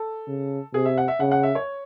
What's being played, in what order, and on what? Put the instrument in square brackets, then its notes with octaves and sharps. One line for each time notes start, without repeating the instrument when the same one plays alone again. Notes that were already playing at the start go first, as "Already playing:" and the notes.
Already playing: [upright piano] A4
[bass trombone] C#3
[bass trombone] C3 [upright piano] G#4
[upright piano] E5
F#5
E5
[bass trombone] C#3 [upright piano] F#5
[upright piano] F#5
E5
C#5